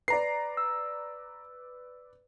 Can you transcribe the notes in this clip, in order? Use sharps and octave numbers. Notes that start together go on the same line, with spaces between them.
B4 D5 A#5 C7
E6